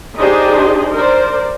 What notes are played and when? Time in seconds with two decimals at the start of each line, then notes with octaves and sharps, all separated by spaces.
0.19 D4 D#4 G4 G#4 C5 D#5
0.94 A#4 C5 D5